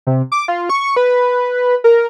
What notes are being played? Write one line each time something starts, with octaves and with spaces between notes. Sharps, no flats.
C3
D6
F4
C#6
B4
A#4